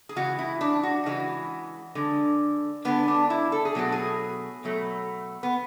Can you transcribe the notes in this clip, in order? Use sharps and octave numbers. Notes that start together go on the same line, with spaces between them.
G#4
C#3 E3 G#3 F#4
E4
D4
F#4
C#3 E3 G#3 F#4
D3 G#3
D3 G#3 B3
D4
E4
A4
G#4
B2 F#3 A3 F#4
G#4
B2 F#3 A3
B3